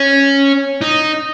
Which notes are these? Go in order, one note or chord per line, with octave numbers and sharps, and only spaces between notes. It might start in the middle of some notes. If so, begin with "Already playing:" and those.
Already playing: C#4
D#4